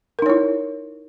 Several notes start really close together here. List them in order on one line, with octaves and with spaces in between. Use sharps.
A#4 D#4 C#5 E4